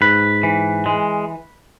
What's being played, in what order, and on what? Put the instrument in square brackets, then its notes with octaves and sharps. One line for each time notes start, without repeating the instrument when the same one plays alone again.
[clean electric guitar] G#2 B4
E3
G#3